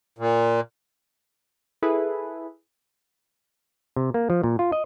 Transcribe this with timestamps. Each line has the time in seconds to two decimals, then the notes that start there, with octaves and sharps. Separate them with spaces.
0.18 A#2
1.82 E4 G#4 A4 B4
3.96 C3
4.14 A#3
4.30 F3
4.43 A#2
4.59 F4
4.72 D#5